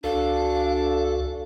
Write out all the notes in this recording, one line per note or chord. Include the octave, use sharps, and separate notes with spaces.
C#2 D4 F#4 A4 D5 F5